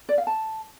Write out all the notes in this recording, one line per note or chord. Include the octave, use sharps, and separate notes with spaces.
D5
F5
A5